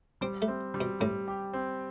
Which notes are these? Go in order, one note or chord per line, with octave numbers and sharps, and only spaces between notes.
G3 C4
A3
C4
G3
B2
A2 G3
G4
C4